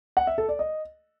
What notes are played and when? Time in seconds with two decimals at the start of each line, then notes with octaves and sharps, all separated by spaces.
0.17 F#5
0.27 E5
0.38 A4
0.49 D5
0.59 D#5